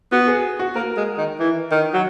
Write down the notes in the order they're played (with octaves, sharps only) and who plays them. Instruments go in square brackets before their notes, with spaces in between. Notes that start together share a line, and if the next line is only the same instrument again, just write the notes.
[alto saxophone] B3 [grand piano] F#4
[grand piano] G#4
F#4
[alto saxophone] A#3 [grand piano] A#4
[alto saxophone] G#3
D#3
E3
D#3
F#3